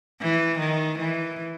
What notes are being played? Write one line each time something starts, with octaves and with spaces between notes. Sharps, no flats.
E3
D#3
E3